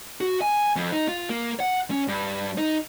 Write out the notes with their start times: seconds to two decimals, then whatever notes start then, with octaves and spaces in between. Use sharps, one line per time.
0.21 F#4
0.42 G#5
0.76 F2
0.92 D#4
1.08 F4
1.29 A#3
1.60 F#5
1.91 C#4
2.08 G2
2.58 D#4